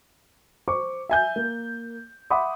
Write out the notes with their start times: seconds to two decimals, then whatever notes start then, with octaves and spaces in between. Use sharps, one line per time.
0.68 C5 C#6 D6
1.09 E5 G#5 G6
1.36 A#3
2.30 E5 F#5 B5 C6 D6 D#6